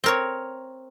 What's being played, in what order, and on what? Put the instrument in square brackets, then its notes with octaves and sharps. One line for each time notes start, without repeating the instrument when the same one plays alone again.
[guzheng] C4 A#4 C#5